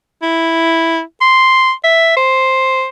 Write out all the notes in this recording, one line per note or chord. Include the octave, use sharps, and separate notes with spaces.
E4
C6
E5
C5